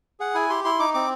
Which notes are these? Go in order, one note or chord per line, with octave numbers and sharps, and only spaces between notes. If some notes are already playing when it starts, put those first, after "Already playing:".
G#4 F#5
E4 G#5
G4 C6
E4 C6
D#4 D6
C4 D6